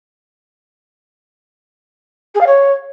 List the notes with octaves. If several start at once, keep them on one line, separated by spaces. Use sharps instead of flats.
G#4
F5
C#5